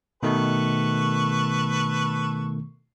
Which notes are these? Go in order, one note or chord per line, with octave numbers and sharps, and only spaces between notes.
B2 D#3 A3 A4 B4 C#6